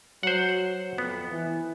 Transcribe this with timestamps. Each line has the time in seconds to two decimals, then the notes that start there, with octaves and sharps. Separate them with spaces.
0.23 F#3 C5 F#5
0.98 F2 B3
1.31 E3